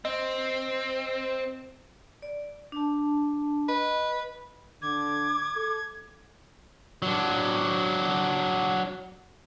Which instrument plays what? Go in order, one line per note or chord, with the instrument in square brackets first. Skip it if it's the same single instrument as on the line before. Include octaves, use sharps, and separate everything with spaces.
[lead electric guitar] C4 [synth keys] D#5
[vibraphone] D5
D4 A5
[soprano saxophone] B4 [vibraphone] D#5
[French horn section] D3 [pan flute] D6 [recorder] G#6
[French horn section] A4
[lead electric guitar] F#3 D4